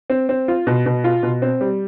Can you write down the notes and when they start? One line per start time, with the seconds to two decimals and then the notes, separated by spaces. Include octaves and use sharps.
0.10 C4
0.29 C4
0.48 F4
0.67 B2
0.86 B2
1.04 F4
1.23 B2
1.42 C4
1.61 G3